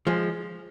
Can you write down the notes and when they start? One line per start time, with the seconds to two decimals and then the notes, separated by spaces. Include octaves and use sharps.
0.07 F3 G#3